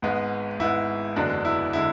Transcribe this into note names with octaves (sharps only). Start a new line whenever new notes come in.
G#1 G#2 G#3 B3
G#1 G#2 G#3 B3 E4
F#1 E2 D3 G#3 B3 D4 F#4
E4
D3 G#3 E4